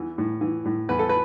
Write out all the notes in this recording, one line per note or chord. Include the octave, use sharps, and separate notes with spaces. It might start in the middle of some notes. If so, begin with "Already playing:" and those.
Already playing: E2 E3
A2
E3
A2
E2 B4
A4
B4